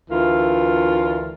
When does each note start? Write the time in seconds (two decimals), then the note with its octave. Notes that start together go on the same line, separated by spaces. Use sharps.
0.09 D2 E3 F4 A#4